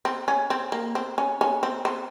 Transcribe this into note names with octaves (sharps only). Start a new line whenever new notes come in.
C4
C#4
C4
A#3
C4
C#4
C#4
C4
C4